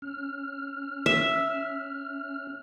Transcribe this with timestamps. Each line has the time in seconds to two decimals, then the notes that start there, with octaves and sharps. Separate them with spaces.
0.02 C#4 F6
1.06 E5